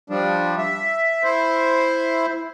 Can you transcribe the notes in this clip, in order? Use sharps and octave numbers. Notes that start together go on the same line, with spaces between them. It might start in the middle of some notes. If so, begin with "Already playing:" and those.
F3 G3 D4
E5
E4 C5